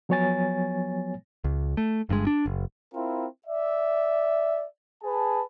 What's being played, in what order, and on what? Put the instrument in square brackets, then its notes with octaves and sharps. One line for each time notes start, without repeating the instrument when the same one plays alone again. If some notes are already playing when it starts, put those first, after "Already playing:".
[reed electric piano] F3 F#3 B3 C#5 G#5 A6
[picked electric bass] C#2
A3
G1 G2 A#2 G#3
D4
F#1
[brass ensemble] C4 E4 F4 A#4
D5 E5
G#4 B4 A5